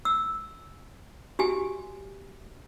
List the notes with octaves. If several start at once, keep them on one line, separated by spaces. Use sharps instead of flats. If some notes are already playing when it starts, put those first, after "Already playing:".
E6
F#4 G4 G#5